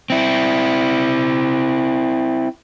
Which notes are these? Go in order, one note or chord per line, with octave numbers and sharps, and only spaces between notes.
C4 E4